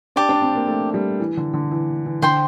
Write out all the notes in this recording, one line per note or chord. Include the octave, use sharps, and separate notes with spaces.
D4 G4 D5 A5 D6
D4
C4
A#3
A3
G3
E3
D3
D3
E3
E3
D3 C5 G5 C6